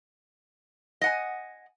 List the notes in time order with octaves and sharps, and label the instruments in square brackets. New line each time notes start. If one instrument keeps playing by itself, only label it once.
[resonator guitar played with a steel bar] D#5 F#5 G#5